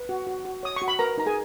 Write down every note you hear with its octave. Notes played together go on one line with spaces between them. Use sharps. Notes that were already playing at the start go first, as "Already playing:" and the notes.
Already playing: B4
F#4
F#4
F#4
C#5 D#6
C#6
F#4
B5
A#4 B4 A#5
D#4 A#5
G#4 G#5